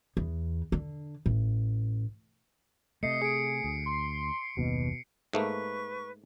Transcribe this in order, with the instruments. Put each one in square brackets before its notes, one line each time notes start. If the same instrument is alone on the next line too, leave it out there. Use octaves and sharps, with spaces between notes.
[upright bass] E2
D3
A1
[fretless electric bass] C3 A3 [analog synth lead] D#5 [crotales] C7 C#7
[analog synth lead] G#4 [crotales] C#7 D7
[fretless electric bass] D2
[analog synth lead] C6
[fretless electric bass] F#1 D#2 [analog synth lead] B2
[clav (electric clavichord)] G#2 A3 A#3 [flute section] B4 C#6